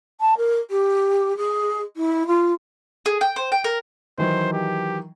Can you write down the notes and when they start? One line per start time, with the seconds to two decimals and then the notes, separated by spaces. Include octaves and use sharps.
0.20 A5
0.37 A#4
0.70 G4
1.36 G#4
1.96 E4
2.26 F4
3.06 G#4
3.21 G5
3.36 C5
3.52 G5
3.64 A#4
4.18 D#3 E3 F#3 C5
4.53 G4